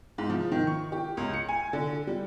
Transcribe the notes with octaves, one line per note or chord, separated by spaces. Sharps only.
G#2
F3
D#3
C#6
G4
C#2
C#7
G#5
D3
G3